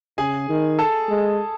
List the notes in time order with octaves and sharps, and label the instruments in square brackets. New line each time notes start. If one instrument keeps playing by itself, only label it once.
[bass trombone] C#3 [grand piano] G#4 G#5
[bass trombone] D#3
[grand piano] A4 A5
[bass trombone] G#3